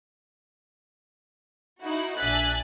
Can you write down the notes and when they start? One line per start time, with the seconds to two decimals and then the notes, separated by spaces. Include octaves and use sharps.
1.81 D#4 E4 F#4
2.18 A#1 D4 E5 G#5 F#6 A6